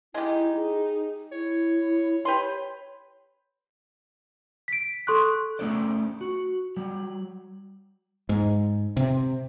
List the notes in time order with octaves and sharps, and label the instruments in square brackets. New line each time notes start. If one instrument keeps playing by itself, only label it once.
[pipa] G#3 G4 [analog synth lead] D#4 [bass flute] E4
[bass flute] G#4
[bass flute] E4 [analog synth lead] C#5
[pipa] G4 B4 C6 [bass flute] C#5
[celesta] B6 D7
A4 C6 C#6 F#6
[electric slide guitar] A3 C#4 A4 C5 D5
F#4
F#3 G3
[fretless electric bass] G#2
C3